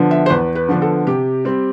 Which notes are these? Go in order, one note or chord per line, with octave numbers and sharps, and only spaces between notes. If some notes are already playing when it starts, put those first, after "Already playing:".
Already playing: D3 F3 B3 D4
E5
C5
E2 B4
B4
D3 F3 B3 D4
A4
C3 G4
G3 C4